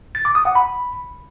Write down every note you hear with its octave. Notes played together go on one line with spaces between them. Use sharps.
A6
D6
D#6
F#5
B5